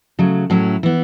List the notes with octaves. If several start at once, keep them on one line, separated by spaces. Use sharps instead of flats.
C#3 F#3 A3
A2 F#3 C#4 E4
E3 B3